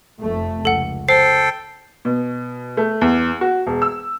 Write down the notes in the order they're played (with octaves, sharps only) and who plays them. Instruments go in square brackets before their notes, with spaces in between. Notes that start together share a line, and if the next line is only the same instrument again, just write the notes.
[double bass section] F1 F2 A3
[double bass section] C#2 [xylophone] A4 F#5
[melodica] A4 G5 [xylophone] C5 [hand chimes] C7
[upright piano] B2
A3
E2
F#4
E1
E6